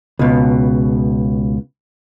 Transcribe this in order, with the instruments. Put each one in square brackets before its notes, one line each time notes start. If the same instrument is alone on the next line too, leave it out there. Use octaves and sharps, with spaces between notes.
[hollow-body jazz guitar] C#2 B2